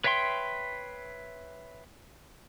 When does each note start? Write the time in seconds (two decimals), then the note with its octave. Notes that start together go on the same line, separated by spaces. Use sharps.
0.04 B4 C#5 E5 G5 C6